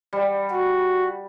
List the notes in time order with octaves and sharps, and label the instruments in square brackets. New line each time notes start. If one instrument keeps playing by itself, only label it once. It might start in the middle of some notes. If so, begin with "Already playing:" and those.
[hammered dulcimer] G3
[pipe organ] F#4